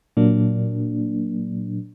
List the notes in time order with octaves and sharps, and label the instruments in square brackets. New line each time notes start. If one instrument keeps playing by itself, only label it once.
[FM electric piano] A#2 F#3 A#3 D4